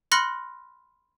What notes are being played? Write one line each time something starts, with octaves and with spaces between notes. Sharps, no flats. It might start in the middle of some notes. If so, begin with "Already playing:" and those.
B5 C6 F6 F#6 A#6 C#7